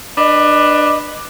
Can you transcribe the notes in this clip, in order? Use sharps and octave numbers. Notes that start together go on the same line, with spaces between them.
D4 B4 D#5